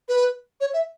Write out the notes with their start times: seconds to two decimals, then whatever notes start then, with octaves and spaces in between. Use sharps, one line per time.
0.08 B4
0.61 C#5
0.73 E5